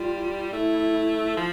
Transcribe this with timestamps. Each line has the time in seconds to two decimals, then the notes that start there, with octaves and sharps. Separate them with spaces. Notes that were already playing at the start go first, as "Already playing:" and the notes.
Already playing: G3 F4
0.52 A3 E4
1.37 F3